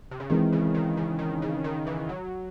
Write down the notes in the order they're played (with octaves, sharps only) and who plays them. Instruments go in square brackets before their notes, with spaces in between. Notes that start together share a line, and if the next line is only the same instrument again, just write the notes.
[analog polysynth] C3
C#3
[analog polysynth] D#3 [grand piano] E3 G#3 C4 E4 G#4
[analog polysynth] C#3
D#3
C#3
D#3
C#3
D#3
E3
F#3